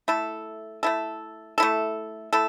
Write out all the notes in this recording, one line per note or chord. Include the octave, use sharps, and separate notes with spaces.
A3 E4 A4
A3 E4 A4
A3 E4 A4
A3 E4 A4